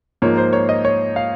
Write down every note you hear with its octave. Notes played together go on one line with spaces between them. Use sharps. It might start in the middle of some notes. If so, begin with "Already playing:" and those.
G#2 F3 A#3 C#5
C5
C#5
D#5
C#5
F5